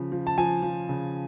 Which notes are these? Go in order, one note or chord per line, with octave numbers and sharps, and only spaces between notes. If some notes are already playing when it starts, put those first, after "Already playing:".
Already playing: C#3 F3
F3
A5
F3 G#5
F3
C#3